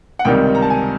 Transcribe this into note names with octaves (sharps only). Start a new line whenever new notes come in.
F#5
C#2 C3 D#3 G3 G5
A#5
A5
G#5